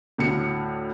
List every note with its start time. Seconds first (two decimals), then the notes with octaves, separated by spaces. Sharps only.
0.18 D2 A2 C#7